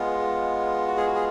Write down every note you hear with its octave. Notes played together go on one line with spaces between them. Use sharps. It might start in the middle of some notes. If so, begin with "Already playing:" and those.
Already playing: G#3 B3 F4
F#4
G#4
F#4
G#4